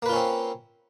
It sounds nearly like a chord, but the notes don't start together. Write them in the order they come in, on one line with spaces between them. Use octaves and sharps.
A#3 B4 F4 C#4 C4